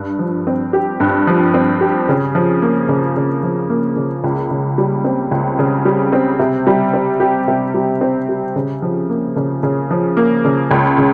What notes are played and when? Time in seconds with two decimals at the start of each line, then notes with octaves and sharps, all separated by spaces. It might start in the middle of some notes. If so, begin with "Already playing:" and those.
Already playing: G2
0.19 F3
0.47 C4
0.73 G4
1.00 G2
1.27 F3
1.54 C4
1.81 G4
2.09 C#3
2.35 F3
2.62 A#3
2.89 C#3
3.16 C#3
3.43 F3
3.70 A#3
3.96 C#3
4.24 C#2
4.51 C#3
4.78 G3
5.04 C4
5.31 C#2
5.59 C#3
5.85 G3
6.12 C4
6.39 C3
6.67 G3
6.94 C4
7.20 G4
7.48 C3
7.74 G3
8.01 C4
8.29 G4
8.56 C#3
8.82 F3
9.09 A#3
9.36 C#3
9.63 C#3
9.91 F3
10.17 A#3
10.45 C#3
10.71 C#2
10.98 C#3